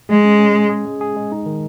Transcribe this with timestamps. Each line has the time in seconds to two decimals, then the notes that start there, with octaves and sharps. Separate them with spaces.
0.09 G#3 G#4
0.25 C#4
0.39 C#4
0.55 G#4
0.69 G#4
0.86 G#3
1.01 G#4
1.17 G#3
1.32 D#4
1.46 D#3